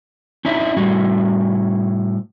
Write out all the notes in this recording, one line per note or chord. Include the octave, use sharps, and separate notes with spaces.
C#4 D#4 E4 E5
A2 G3 F#4